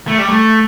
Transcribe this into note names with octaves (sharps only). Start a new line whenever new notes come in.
A3
G3
A3